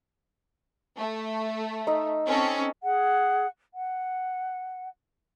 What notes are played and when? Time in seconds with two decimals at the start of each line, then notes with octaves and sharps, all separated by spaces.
0.97 A3
1.87 D#4 E5
2.28 C4 C#4 A4
2.83 G#4 F#5
3.74 F#5